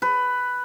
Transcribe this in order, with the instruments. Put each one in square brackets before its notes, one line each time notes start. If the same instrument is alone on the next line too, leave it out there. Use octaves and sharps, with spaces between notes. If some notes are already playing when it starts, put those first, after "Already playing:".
[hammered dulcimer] B4